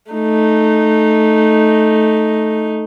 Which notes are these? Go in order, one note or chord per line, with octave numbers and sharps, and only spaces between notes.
A3 D#4